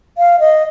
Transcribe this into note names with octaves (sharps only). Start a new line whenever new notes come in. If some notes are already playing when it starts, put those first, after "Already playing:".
F5
D#5